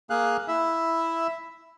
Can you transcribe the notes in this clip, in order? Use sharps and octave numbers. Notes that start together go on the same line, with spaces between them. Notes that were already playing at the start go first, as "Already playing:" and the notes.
A#3 G#4 F5 F#6
E4 E5